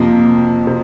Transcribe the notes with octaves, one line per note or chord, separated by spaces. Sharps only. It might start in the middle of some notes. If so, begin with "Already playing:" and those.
Already playing: F2 C3 F3 A#3
C3